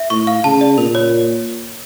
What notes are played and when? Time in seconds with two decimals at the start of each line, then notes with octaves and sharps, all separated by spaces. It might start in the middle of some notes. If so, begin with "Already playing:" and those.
Already playing: E5
0.10 A2 C#6
0.27 F5
0.44 C#3 A5
0.61 D5
0.78 A#2 A#4
0.95 C#5